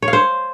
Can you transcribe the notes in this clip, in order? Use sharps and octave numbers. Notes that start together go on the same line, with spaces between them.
C#5
F5
C5